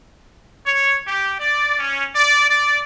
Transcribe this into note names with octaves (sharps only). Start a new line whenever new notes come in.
C#5
G4
D5
C#4
D5
D5